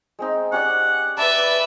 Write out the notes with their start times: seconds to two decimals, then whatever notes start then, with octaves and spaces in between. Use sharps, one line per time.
0.19 G#3 C4 D#4
0.52 C#4 G4 D5 F#5
1.18 B4 D5 E5 A5 B5